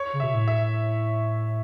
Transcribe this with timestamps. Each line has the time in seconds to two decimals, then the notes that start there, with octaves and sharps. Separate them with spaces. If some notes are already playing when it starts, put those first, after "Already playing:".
Already playing: C#5
0.13 C#3
0.20 B2 E5
0.34 A2
0.48 E5